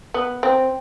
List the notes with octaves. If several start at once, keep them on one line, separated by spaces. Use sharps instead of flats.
B3
C4